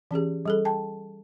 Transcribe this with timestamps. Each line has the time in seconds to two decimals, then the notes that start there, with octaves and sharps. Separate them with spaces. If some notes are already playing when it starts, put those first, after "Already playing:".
0.11 E3 C#4 G4 G#4
0.45 G3 G#4 A4
0.65 G5 A5